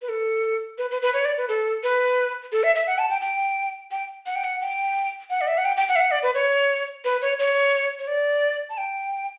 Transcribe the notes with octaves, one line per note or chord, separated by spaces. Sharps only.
B4
A4
B4
B4
B4
C#5
D5
B4
A4
B4
A4
E5
E5
F#5
A5
G5
G5
G5
F#5
G5
F#5
G5
F#5
D5
E5
F#5
G5
G5
F#5
E5
F#5
D5
B4
C#5
B4
C#5
C#5
C#5
D5
A5
G5